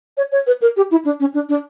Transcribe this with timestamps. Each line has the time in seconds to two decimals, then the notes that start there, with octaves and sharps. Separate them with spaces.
0.17 C#5
0.32 C#5
0.47 B4
0.62 A#4
0.77 G4
0.91 E4
1.05 D4
1.20 C#4
1.34 D4
1.49 D4